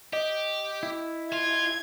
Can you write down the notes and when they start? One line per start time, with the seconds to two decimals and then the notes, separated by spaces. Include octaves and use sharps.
0.13 G4 D#5
0.83 E4
1.33 F4 G#6